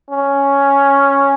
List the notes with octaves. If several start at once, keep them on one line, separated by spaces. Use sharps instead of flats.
C#4